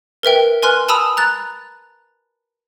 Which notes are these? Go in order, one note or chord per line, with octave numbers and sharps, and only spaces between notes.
A#4 B4 E5 G5
B4 G#5 C6 F6 F#6
G#5 A5 B5 D#6 E6 F7
A#5 F#6 A6